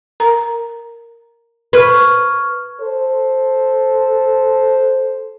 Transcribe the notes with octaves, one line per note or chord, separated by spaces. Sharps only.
A#4 A#5
B4 C#6 F6 G#6
A4 C5